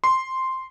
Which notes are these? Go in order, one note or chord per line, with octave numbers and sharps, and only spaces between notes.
C6